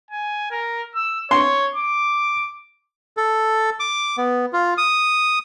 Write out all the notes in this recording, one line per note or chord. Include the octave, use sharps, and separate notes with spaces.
G#5
A#4
E6
C#5 C6
D6
A4
D6
B3
F4
D#6